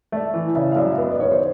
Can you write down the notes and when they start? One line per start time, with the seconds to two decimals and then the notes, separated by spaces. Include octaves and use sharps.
0.12 A3 D5 E5
0.34 E3
0.55 C#3 D5 E5
0.72 F5
0.76 F#2 D5 E5
0.97 B3 D#5
1.09 D5
1.19 D#3 C#5
1.31 C5 D5